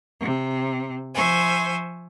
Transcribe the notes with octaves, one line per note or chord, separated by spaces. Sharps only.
C3
F3 C5 E5 G#5 C#6